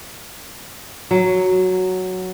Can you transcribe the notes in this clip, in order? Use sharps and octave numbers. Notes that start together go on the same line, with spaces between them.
F#3